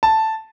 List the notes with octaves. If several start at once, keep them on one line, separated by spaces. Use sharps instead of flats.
A5